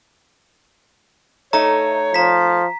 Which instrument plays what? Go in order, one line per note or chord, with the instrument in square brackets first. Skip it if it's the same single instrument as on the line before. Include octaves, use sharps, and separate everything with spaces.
[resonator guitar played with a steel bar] A3 D#4 [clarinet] C#5 [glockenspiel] A#5
[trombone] F3 [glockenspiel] A#5 B6